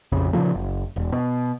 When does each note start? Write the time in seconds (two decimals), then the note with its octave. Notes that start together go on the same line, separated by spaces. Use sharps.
0.12 A#1 F2 C#3
0.33 A#2 C#3 F3 A3
0.54 F#1
0.96 E1
1.12 B2